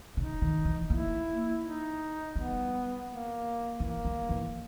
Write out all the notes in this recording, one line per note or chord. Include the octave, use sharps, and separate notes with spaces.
C#3 D#4
D#3
E3
A#3 E4
D#4
G3 B3
A#3
E3 A#3
G3
E3